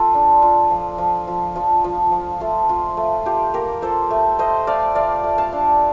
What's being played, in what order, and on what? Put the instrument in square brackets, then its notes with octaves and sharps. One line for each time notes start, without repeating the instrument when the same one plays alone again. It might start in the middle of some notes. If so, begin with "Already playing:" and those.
Already playing: [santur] F4 A4
D4
F4
F3
F3
F3
F3
F3
F3
A3 F4
F4
A3
F4 G4
A#3 G4 A#4
F4 A4 C5
A3
A3 C5 D#5
A3 D5 F5
A3 D5 F5
A3
F5 A5
D4